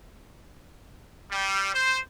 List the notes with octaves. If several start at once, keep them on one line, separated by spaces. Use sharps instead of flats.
G3
C5